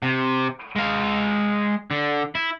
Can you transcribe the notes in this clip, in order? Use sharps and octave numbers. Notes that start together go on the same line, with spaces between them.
C3
G#3 F5
D3
E4